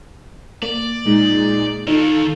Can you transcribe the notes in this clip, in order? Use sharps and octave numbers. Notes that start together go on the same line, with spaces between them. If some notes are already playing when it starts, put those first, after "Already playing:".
A#3 D5
A#2 G#3 D#4
D#3 A#3 D#4 F4 A4